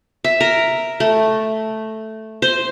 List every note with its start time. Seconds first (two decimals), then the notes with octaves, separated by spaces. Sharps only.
0.24 E5
0.41 A#4
1.00 A3
2.42 C5